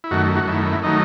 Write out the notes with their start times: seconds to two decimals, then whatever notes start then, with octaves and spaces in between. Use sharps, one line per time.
0.04 E4
0.11 F#2 D#3 A3 F#4
0.36 F#4
0.47 F#2 D#3 A3 E4
0.83 D#3 F#3 A3 D#4